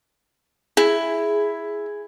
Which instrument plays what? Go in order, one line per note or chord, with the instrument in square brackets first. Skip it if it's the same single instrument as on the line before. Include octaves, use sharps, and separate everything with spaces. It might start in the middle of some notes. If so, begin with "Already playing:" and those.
[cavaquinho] E4 [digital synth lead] G#4